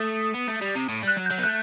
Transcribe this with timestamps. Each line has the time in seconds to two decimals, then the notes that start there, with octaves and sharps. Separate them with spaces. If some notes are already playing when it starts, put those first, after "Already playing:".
Already playing: A3 D#6
0.35 B3
0.48 A3
0.62 G3
0.76 C3
0.89 A2
1.03 G3 F#6
1.17 F#3
1.26 G6
1.30 F#3
1.38 B3
1.43 A3 F#6